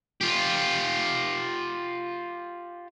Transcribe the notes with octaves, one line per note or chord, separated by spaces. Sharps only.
F4 G4